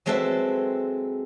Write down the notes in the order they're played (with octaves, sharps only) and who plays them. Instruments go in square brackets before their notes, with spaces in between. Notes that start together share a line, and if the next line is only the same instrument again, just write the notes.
[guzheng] F#3 G#3 C4 A4 B4 E5